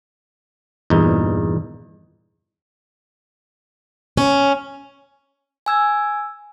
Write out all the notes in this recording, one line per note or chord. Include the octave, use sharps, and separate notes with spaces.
E2 G2 A#2 D#4
C#4
G#5 E6 G#6